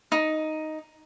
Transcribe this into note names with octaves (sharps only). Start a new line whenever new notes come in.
D#4